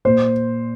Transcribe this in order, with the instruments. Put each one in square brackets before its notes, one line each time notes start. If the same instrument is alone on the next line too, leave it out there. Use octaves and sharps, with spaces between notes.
[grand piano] A#2 C5